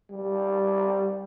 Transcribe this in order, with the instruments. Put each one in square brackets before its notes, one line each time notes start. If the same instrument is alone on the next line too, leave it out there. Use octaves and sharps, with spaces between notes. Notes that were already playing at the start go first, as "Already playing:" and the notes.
[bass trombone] G3